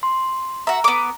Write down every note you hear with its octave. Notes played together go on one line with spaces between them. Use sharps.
C6
F#4 E5 A#5
B3 D6